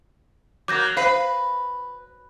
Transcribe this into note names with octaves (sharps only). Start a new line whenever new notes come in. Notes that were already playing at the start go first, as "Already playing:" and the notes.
F#3 A#3 D6 G6 A#6
B4 C5 F5 C7